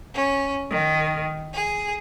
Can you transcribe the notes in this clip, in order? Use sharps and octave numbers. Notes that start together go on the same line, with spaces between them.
C#4
D#3
G#4